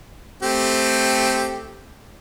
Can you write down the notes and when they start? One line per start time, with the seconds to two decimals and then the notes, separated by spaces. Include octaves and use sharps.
0.42 A3 C4 G4